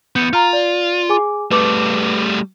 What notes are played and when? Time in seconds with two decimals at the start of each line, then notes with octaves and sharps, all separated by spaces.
0.16 E2 B3 G6 C#7
0.33 F4 A#5 F6
0.53 D5
1.09 G#4 G#5 D6
1.51 G3 A3 B4 D6